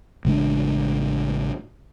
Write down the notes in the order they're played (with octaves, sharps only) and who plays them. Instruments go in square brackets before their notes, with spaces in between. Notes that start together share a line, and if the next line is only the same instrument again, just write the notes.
[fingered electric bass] A1 C#3 G#3 D4